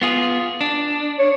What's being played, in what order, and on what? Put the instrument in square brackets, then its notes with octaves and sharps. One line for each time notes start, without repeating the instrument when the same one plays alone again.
[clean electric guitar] B3 F4 G#4
D4
[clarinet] C#5